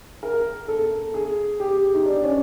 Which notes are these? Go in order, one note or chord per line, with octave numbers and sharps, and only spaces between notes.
A#4
A4
G#4
G4
D#4
D4
C#4